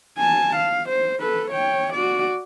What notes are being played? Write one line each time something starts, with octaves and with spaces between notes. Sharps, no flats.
G#5 A5
F5
C5
A4 B4
C#5 G5
F#4 D5